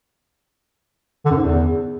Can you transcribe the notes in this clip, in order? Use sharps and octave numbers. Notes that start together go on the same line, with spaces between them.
D3
F#2
G#2
E2